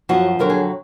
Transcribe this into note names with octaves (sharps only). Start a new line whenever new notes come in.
F#2 F3 F#4
F2 D3 F#3 A#4
G#4